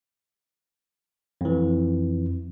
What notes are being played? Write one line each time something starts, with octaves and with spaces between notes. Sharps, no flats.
F2 E3